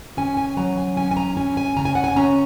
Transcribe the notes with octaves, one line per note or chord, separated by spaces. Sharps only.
C#4 G#5
G#5
F#3 A#5
G#5
C#4 G#5
G#5
A#5
C#4 G#5
G#5
C#3 A#5
G#5
F#5
G#5
C#4 A#5